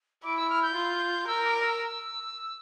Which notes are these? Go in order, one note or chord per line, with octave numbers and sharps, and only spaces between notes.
E4 D6
E6
F6
G6
F4
A#4 E6
D6
E6